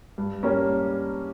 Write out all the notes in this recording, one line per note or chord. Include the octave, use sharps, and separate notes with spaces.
G2
G3 A#3 C#4